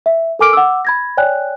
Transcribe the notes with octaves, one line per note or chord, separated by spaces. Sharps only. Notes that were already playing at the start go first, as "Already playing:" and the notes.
E5
A4 A#4 G#5 D6 F6 D7
F#5 D6 E6
B5 G#6 A#6
C#5 D5 G5 G#5 F#6